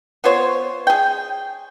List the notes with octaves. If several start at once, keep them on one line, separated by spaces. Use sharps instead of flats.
B3 F4 C5 C#5
G#4 G5